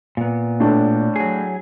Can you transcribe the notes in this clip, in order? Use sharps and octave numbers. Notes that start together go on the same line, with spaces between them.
A#2 B3
A2 D4
F#3 G#4